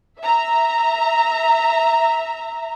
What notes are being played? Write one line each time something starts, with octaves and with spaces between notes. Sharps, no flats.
E5 A#5